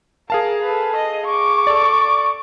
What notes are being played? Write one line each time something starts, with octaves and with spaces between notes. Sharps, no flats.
G#4 A#4 F5 A5
A4 B4
D#5
C#6 D6
A4 D5